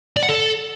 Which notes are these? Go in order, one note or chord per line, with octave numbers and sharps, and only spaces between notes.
D5
F#5
A4